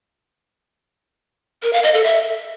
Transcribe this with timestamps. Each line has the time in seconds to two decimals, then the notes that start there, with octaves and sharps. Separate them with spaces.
1.63 A#4
1.73 F5
1.83 D#5
1.93 A4
2.04 E5